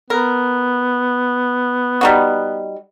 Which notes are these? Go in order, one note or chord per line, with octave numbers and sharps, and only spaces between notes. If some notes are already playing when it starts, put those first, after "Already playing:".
B3 A#4
G3 D#4 F#4